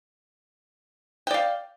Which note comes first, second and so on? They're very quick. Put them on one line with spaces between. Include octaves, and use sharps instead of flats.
G5 D5 F5